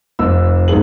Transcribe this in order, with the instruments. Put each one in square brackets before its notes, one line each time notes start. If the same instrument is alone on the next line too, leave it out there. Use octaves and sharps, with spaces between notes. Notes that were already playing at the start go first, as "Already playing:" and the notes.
[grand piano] F1 E6
C2 G#2 B3 G#4 F#7